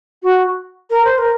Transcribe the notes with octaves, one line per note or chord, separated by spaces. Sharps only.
F#4
A#4
C5
A#4